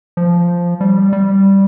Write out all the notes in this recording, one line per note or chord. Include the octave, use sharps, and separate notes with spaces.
F3
G3
G3